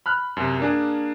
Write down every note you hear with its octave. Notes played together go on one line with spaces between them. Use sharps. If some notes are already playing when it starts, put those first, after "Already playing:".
B5 F6 F#6
F#2 C3
A#3 D4 G#4